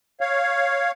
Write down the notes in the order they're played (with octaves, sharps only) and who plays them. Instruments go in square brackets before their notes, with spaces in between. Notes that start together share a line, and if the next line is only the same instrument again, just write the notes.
[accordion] C#5 F5